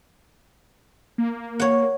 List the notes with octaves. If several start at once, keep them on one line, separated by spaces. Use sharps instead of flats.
A#3
C#5 F#5